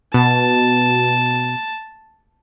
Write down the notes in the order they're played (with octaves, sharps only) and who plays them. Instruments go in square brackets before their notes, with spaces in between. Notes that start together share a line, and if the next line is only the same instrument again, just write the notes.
[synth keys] B2 [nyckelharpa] A5